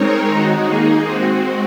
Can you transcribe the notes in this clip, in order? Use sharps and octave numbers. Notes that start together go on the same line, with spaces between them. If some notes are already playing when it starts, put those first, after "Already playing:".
Already playing: G#3 C4 D#4 A#4 C#5
D#3 G#3 D#4 F#4
A#3 D#4 G#4
G#3 C4 F#4